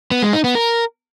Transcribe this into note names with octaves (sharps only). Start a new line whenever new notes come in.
B3
G#3
D#4
B3
A#4